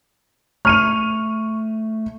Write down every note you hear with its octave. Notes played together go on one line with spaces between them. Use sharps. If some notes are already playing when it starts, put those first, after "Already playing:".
A3 C#6 F6 D#7 F7